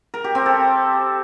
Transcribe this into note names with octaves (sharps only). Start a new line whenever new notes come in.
A#4
G4
C4
A4